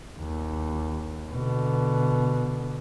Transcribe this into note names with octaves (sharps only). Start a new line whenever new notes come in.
D#2
B2 D3